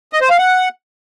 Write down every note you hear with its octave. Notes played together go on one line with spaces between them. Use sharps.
D#5
C5
F5
F#5